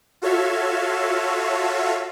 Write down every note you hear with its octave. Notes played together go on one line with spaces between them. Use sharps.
F4 F#4 A4 C#5 E5 F5